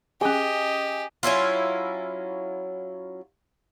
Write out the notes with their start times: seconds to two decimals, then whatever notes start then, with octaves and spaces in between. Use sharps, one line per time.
0.21 C#4 G4 G#4 D#5 G#5
1.23 F#3 C#4 E4 F4